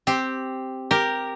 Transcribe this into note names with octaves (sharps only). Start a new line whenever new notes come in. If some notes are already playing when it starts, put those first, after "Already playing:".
C4 G4
G4 A#4